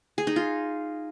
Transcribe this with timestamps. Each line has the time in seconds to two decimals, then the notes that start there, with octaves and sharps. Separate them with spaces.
0.18 G#4
0.27 D#4
0.36 F4